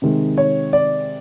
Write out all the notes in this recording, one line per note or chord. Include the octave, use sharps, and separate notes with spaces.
C3 D#3 G#3
C#5
D5